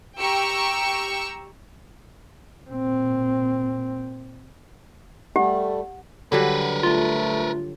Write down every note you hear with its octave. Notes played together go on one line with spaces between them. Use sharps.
G4 G5 A#5 C#6 E6 C#7
A#2 C4
G3 A3 G4 F#5
D3 F#3 G3 A#4 B4
A3 F4